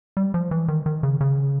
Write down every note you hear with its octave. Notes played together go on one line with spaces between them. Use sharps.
G3
F3
E3
D#3
D#3
C#3
C#3